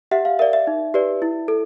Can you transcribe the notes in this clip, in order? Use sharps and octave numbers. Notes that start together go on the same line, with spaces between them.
G4 E5 F#5
F5
A#4 D5 E5
E5
D#4
G4 B4 D5
E4
A4